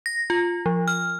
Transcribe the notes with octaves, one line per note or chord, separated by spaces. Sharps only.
A#6
F4
F3
F6